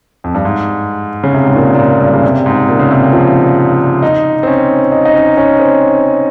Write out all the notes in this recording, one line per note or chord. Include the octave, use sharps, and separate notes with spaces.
F2
G2
G#2
C#3
C3
G#2
A#2
A#2
G#2
G2
C#3
C3
G#2
A#2
C#3
C3
F3
D#4
C4
C#4
D#4
D#4
C#4
C#4
C4